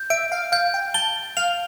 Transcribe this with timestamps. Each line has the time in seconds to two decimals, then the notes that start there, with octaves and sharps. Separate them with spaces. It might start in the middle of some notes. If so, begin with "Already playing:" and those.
Already playing: G6
0.10 E5 D7
0.32 F5
0.52 F5 G6
0.74 G5
0.94 A5 G7
1.37 F5 F7